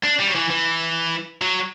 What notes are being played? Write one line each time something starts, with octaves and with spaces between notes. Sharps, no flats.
D4
G3
F#3
E3
E3
F#3